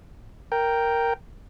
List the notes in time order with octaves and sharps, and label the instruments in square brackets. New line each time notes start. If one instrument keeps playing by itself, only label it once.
[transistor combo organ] A#4 G5